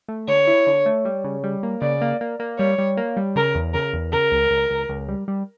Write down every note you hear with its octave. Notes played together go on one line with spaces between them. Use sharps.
A3
D3 C#5
E4
D3
A3
G3
C#3
G3
A#3
C#3 D5
A#3
A#3
A#3
G3 C#5
G3
A#3
G3
C#3 A#4
E2
C#3 A#4
E2
C#3 A#4
C#2
C#2
C#2
C#2
G3
G3